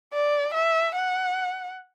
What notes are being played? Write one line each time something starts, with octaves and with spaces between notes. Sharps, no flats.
D5
E5
F#5